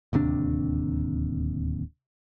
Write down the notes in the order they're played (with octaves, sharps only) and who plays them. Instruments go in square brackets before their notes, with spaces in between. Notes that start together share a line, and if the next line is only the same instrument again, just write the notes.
[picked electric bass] D1 D#2 C3 D4